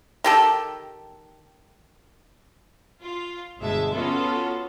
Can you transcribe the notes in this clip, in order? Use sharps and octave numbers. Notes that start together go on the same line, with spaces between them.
D#3 G4 A4
F4
G1 B2 G#3 E5 A5
B3 C#4 F4 F#4 A4